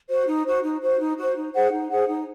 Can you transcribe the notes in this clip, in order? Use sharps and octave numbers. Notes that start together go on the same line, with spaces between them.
F#4 C5
D#4
F#4 C5
D#4
F#4 C5
D#4
F#4 C5
D#4
G#4 C5 F#5
D#4
G#4 C5 F#5
D#4